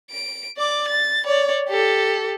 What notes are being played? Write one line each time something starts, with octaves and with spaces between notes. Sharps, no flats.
D7
D5 D6
A6
C#5 D5
G4 A4